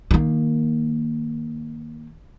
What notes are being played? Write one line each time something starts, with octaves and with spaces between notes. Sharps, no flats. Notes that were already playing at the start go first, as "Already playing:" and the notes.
D#3 A#3